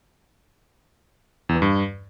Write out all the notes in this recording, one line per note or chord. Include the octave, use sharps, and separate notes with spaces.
E2
E3
G2